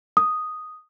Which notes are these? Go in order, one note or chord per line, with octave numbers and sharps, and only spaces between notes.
D#6